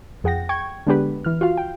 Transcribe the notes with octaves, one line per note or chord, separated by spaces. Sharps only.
F2 G#4 F#5 G5 A#6
G5 C#6 G#6
D3 G#3 B3 D4 G4 B4
E3 F6
F4 F#4 F5
G5